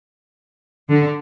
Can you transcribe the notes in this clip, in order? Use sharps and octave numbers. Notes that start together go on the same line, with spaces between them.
D3